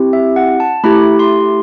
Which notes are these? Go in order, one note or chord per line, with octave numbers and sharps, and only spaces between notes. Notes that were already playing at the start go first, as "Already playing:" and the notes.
Already playing: C4 E4 G4
E5
F#5
A5
A3 E4 G4 B5
C6